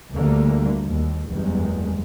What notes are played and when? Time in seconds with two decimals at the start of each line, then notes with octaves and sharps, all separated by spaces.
0.13 D2 D3 G3 A3 A#3
0.84 D#2
1.29 F#1 E2 G2 G3 G#3